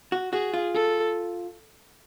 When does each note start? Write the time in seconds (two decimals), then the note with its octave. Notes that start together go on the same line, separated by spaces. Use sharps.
0.12 F#4
0.32 F#4 G#4
0.54 F4
0.74 A4